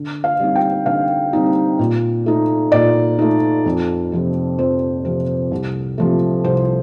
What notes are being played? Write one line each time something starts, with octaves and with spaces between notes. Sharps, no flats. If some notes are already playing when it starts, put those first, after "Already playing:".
Already playing: D3
F5
G3 C4 D#4
G5
D3 F5
G3 C4 D#4
A#2
A3 D#4
A#2 D5
A3 D#4
F2
C3 F3 C4
F2 C5
C3 F3 C4
C2
C3 F3 A3
C2 C5